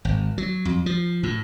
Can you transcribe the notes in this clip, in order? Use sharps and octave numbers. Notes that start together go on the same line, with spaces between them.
G#1
F#3
F2
F3
A2